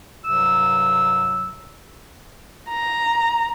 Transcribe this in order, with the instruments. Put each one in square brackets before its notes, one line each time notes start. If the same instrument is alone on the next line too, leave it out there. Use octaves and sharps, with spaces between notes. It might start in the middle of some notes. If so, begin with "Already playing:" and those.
[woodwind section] C2 G2 C3 F#3 E6
[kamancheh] A#5